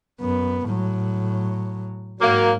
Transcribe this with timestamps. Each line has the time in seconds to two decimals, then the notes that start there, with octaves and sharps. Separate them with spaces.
0.20 F#2 B3
0.66 A2 F#3
2.20 G#2 F#3 A#3